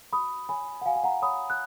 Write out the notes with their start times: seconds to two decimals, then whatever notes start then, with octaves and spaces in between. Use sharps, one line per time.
0.13 F#4 B5 D#6
0.49 C#5 G#5 B5
0.82 F#5
0.86 F#4 F5 G#5
0.96 G#5
1.04 F#5 A#5
1.22 C#5 B5 D#6
1.50 F#6